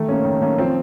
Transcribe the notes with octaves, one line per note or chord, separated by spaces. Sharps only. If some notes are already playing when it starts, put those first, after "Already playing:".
Already playing: D#3 A3 A4
A#3 C#4
D#3
A#3 C#4
F3 C4 C5